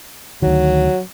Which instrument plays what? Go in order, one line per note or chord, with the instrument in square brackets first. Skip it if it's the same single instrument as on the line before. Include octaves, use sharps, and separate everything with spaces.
[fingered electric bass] D2 D#3 [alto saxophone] F#3